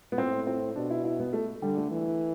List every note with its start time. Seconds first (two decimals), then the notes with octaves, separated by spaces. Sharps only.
0.12 B3
0.18 A2 C4
0.47 C4
0.76 B2 D4
0.90 E4
1.04 E4
1.20 B3
1.33 A3
1.62 D3 G3
1.77 A3
1.91 E3